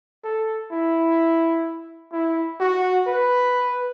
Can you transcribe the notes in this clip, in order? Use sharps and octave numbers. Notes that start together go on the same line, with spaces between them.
A4
E4
E4
F#4
B4